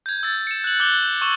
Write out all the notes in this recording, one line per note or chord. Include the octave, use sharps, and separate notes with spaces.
G6 G#6
E6 A6
C#7 E7
F#6 F#7
D6 F#6 G6 G7
C#6 E6 E7 F#7 G7